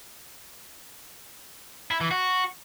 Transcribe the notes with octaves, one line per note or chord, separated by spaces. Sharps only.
E4
E3
F#4